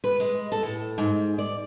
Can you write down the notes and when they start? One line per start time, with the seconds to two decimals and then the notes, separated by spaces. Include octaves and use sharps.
0.04 B4
0.20 G#3
0.52 A4
0.63 A2
0.98 G#2
1.38 D5